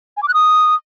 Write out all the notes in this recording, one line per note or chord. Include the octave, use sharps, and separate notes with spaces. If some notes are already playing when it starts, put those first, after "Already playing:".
G#5
D6
F#6
D#6